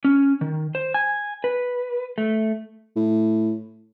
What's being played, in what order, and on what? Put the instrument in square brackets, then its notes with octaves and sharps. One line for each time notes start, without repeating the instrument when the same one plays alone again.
[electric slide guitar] C#4
D#3
C5
G#5
B4
A3
[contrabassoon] A2